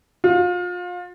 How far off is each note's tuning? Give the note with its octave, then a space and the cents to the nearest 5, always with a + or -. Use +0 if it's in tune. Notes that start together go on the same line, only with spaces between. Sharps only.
F4 +30